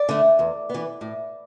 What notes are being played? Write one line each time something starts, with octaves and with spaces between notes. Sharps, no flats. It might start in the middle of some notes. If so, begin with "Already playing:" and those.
Already playing: D5
D3 A3
E2
E3 B3
A2